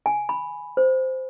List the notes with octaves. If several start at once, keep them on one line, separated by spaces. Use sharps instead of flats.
G#5
B5
C5